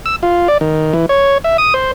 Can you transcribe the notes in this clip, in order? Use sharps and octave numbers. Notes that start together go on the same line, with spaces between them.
E6
F4
D5
D#3
E3
C#5
E5
D#6
C5